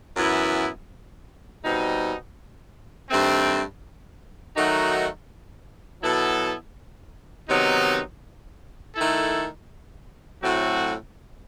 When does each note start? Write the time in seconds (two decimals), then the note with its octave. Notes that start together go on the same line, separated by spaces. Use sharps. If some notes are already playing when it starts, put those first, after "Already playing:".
0.16 F#2 E3 B3 E4
1.63 B2 G3 C4 D#4
3.09 G2 D#3 A3 C4
4.56 D#3 F#3 A3 D#4 F#4
6.02 B2 F#3 B3 E4 A4
7.48 C3 D#3 F#3 B3 D#4
8.95 D#3 A3 E4 A4
10.41 A2 F#3 A3 C4 F#4